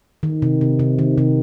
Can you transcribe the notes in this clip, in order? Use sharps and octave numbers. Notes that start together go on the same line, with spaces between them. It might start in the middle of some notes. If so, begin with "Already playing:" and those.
D#3
C3
C3
C3
D#3
C3